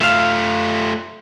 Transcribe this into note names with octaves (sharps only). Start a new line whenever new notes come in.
A3 F4 E5 F5